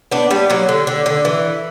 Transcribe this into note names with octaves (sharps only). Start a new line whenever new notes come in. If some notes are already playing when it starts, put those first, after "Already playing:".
B3 D4
G3 B3
F#3 A#3
D3
D3
D3
E3